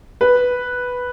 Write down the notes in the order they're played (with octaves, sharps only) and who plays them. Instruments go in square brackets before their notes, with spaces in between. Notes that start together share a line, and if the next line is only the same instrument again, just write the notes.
[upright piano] B4